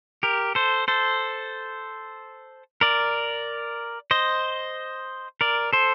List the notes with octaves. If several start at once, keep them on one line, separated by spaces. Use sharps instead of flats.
G4 A#4
A4 C5
A4 C5
A#4 D5
C5 D#5
A#4 D5
A4 C5